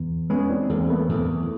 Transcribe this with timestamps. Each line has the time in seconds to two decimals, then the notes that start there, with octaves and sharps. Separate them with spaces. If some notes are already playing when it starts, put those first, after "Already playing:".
Already playing: E2
0.30 G#3 B3 C#4
0.49 C4 D4
0.69 E2 A#3 C4
0.80 C4
0.89 A3 B3
1.08 E2 A3 B3